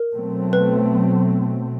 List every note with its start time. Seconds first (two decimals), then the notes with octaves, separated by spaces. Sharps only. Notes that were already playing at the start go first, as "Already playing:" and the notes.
Already playing: A#4
0.14 B2 F#3 A3 C4
0.53 B4